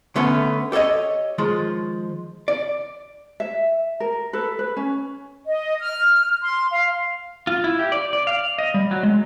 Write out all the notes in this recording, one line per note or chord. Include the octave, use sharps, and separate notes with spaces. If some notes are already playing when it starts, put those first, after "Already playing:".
D3 A3 B3 C#4
G4 A4 C5 C#5 D#5
D#3 F3 G#3
D5
E5
A#4
A4 B4
B4
C#4
D#5
F6
C6
F5
F4
E4
G4
D5
D5
F5
D#5
G3
F#3
G#3